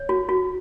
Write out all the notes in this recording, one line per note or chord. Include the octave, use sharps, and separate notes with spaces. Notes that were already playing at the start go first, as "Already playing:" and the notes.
Already playing: C#5
F#4
F#4